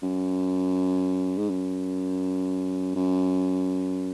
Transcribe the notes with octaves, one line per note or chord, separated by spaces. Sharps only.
F#2
G#2
F#2
F#2